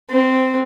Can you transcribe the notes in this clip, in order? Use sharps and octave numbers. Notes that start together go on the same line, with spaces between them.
C4